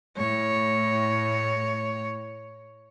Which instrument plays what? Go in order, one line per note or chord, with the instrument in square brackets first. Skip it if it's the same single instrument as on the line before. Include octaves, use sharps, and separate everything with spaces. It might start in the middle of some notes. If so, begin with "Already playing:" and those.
[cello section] A2 [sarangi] C#5